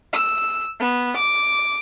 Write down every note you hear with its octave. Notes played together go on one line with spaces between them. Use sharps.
E6
B3
D6